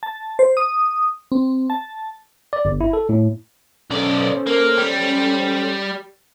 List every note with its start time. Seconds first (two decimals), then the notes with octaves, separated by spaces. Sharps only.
0.03 A5
0.39 C5
0.57 D#6
1.32 C4
1.70 A5
2.53 D5
2.65 G1
2.81 E4
2.93 A4
3.09 A2
3.91 B1 C#4 A4 C5 D5
4.47 A#3
4.77 G3